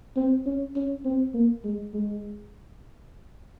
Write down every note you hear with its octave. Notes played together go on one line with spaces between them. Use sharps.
C4
C#4
C#4
C4
A#3
G#3
G#3